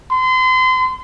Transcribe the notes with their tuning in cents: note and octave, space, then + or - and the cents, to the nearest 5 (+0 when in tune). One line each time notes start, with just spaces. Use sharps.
C6 -35